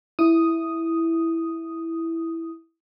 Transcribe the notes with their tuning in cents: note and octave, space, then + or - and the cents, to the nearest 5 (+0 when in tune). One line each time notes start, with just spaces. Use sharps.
E4 +0 D#6 +0